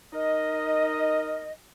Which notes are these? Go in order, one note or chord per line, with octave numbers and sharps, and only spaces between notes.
D#4 A#4 D#5